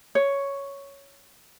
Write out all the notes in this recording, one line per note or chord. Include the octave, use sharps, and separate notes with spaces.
C#5